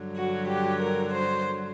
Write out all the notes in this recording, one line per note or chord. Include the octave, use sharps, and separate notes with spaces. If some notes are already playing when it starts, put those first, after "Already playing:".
Already playing: G2 D3 F#3
F#4
G4
A#4
C5